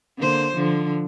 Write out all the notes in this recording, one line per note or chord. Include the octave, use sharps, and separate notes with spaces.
D3 A#3 C5
D3 F3